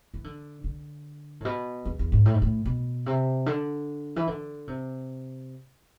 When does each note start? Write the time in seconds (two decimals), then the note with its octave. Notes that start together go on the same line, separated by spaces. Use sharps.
0.14 E3
0.24 D3
0.64 D3
1.40 A2
1.45 B2
1.85 E2
1.99 E2
2.12 G#2
2.26 A2
2.34 G#2
2.42 A2
2.65 B2
3.06 C3
3.46 D3
4.16 E3
4.27 D3
4.67 C3